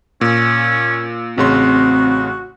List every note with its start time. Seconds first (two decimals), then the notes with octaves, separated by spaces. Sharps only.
0.21 A#2 C#4
1.38 A1 C#3 C4 F#4 C6